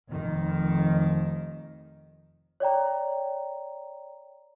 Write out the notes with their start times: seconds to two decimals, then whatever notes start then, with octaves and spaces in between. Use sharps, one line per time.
0.11 F1 F2 D#3
2.60 C#5 D5 G5 A#5